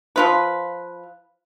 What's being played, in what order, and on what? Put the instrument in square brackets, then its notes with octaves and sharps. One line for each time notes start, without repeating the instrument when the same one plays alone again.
[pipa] F3 F4 B4